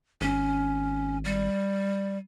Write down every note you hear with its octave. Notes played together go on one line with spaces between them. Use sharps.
G#1 C#4
G3